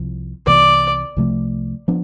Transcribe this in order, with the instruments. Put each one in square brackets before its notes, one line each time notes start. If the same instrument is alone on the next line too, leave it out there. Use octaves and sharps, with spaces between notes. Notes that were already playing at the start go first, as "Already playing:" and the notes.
Already playing: [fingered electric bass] C2 C3 F3
[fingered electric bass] C2 C3 E3 B3 [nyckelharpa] D5
[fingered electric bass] C2 C3 F3 A3
F3 B3 D4